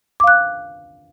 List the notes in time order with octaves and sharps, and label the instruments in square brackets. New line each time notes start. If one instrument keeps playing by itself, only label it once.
[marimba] D6
F5
F#6